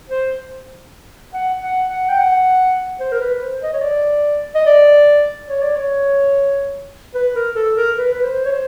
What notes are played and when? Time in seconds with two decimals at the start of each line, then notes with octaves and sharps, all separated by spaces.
0.10 C5
1.34 F#5
1.62 F#5
1.89 F#5
2.09 G5
2.18 F#5
3.00 C5
3.12 A#4
3.21 B4
3.41 C5
3.63 D#5
3.73 C#5
3.82 D5
4.55 D#5
4.66 D5
5.49 C#5
5.62 D5
5.76 C#5
7.15 B4
7.36 A#4
7.55 A4
7.77 A#4
7.97 B4
8.14 B4
8.24 C5
8.46 C#5
8.52 C5